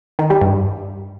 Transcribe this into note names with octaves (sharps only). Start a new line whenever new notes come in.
D#3
G3
G2